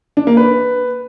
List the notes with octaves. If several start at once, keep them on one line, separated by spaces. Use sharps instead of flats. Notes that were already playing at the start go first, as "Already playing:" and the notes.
D4
A#3
B4